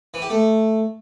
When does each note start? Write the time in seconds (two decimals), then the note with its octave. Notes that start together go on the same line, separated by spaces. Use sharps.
0.14 E3
0.22 G4
0.30 A3